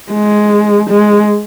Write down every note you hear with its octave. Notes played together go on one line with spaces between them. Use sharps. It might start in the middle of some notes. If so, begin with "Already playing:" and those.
G#3
G#3